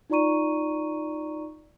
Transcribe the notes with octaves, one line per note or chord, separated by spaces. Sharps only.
D#4 F4 D5 A#5 C#6 D#7